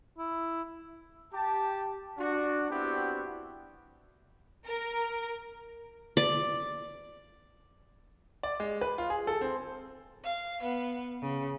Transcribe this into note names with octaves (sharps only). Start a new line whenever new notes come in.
E4
G4 A5
D4 F#4
B3 C4 D4 E4 F#4 G4
A#4
D5
D5
G#3
B4
F4
G#4
A4
C4
F5
B3
C#3